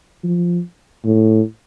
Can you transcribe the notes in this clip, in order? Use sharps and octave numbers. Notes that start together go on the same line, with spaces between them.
F3
A2